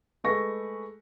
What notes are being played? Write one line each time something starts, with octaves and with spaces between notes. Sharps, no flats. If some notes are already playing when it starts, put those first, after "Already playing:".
G#3 A3 G#4 B4 C#6 A#6